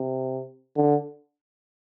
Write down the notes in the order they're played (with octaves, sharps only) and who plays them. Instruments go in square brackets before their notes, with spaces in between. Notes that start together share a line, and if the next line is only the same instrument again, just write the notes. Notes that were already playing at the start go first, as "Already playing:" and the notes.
Already playing: [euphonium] C3
D3